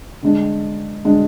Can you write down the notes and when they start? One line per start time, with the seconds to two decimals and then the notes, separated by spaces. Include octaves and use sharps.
0.22 D3 G#3 D4
1.05 D3 G#3 D4